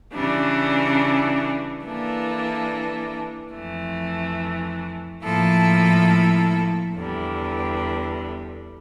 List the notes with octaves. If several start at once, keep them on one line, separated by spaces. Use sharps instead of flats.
C#3 E3 G3 D4
E3 A#3 D4 A4
F2 E3 A3
A2 F3 A#3 E4 A4
E2 D3 G3